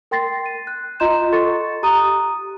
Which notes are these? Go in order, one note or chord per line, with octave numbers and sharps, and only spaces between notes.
A#4 G5 C6 A6 A#6 C7
D#7
F#6
F4 D#5 A#5 C6 G6 E7
A4 F#5 C6 C#6 A6 C#7
G4 A#5 D#6 F#6 D#7